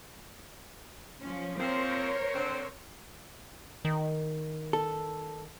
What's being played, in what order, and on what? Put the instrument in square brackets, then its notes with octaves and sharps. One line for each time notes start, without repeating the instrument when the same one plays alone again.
[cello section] F3 C#4
[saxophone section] F3 A#3 C4 [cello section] A#4 C5 C#5
[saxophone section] D3 C4
[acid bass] D#3
[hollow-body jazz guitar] A4